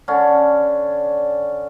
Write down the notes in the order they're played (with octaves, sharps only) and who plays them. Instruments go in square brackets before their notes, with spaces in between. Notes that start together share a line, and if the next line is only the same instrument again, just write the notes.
[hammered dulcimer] D3 C#4